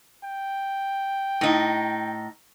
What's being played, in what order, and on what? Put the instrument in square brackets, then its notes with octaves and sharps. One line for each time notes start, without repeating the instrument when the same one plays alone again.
[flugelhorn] G5
[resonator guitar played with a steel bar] A2 D#4